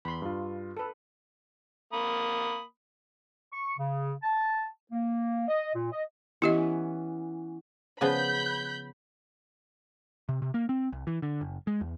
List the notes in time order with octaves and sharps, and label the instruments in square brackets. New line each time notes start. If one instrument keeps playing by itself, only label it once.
[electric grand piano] E2 [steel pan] B5 C6
[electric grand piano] G2 F4
[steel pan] A4 B4
[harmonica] A#3 B5 D#6
[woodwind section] C#6
C#3
A5
A#3
D#5
A#2
D#5
[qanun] E3 B3 C#4 [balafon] E4 G4 D#5
[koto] C#3 F3 B3 [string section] B5 G6
[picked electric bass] C3
C3
A#3
C4
C2
E3
D3
F#1
G#3
E2